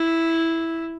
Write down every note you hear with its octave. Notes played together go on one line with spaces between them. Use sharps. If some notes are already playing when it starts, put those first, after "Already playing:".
Already playing: E4